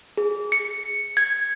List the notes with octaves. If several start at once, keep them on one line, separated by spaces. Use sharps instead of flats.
G#4
C#7
G#6